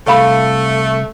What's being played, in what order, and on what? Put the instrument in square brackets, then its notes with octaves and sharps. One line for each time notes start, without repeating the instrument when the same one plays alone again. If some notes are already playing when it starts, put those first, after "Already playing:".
[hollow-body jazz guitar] C2 F5 B5 [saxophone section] A3